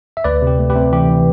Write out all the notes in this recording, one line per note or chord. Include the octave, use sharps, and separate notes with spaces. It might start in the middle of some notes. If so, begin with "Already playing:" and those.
E5
D2 B4 D5
C3
G4
A3
G4 B4
C3
E3 G4
E3